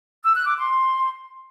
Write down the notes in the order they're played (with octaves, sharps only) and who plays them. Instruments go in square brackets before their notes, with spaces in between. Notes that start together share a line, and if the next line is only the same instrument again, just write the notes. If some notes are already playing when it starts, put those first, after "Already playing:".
[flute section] E6
F#6
D6
C6